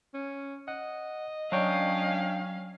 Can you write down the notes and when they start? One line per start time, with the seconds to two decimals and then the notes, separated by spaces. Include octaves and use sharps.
0.14 C#4
0.68 D#5 F#5
1.52 F#3 C#4 D4 C#5 F5 G5